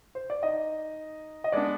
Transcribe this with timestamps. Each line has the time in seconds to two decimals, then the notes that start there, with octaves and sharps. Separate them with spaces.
0.15 C5
0.30 D5
0.43 D#4 D#5
1.44 D#5
1.52 G#3 B3 D4 D5